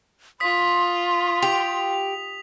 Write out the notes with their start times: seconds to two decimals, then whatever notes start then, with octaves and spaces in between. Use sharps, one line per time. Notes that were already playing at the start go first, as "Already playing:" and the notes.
0.40 F4 C6 D#6 B6
1.42 G4 F7